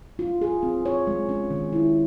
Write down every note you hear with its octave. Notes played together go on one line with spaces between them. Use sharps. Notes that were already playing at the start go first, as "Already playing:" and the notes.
F4
G#4
C4
C#5
G#3
C#4
D#3
E4